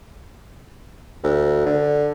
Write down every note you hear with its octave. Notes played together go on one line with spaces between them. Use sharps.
D2
D3